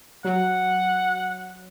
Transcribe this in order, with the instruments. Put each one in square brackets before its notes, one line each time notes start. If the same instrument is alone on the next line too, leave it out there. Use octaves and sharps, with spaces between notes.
[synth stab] F#3 [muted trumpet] F#5